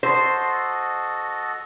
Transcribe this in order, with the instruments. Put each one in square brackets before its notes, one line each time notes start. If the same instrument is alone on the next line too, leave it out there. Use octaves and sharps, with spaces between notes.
[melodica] F#4 A4 D#5 [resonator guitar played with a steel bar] C5